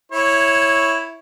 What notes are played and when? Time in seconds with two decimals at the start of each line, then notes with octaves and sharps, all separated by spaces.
0.12 E4 C#5